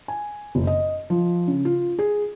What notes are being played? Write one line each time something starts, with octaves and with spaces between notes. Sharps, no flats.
G#5
F#1
D#5
F3
C#3
F4
G#4